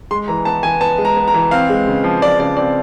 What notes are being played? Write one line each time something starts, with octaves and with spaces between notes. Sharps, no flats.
G#3 C6
E3 A#5
B3 A5
E3 G#5
B3 A5
G#3
A#5
B3
A#5
E3
C4 F5
G#3
C#3
F3
F3 D5
C#3 D5
C4 D5